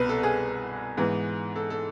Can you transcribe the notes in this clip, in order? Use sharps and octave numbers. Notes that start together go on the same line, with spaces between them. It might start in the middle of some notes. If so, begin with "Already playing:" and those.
Already playing: C2 B2 B3 B4
A4
G#4
G#2 E3 B3
A4
A4